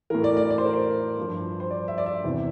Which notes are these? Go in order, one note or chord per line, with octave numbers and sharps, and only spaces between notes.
A2 E3 A#4
D5
D5
D5
C5
A#4
C5
G2 F3
C5
D5
E5
D5
E5
E2 C3 E3